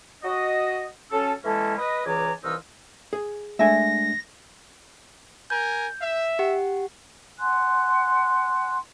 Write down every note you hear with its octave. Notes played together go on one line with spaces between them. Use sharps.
F#4 D#5
F#3 C#4 A4
E3 G#3 A#3 C#4 A4
B4 D#5
C#2 E3 D5 G#5 A#5
C2 E3 D#4 F4 E6
G#4
G#3 A3 D4 E5 G#5 A#6
A#4 G#5 G6
E5
G4 F#5
F#5 G#5 C6 F#6